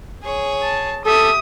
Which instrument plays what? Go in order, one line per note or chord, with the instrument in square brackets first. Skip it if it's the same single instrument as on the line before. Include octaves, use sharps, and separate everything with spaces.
[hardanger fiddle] G#4 C#5
[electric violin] A5
[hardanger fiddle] G4 E5 [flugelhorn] A4 [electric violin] D#6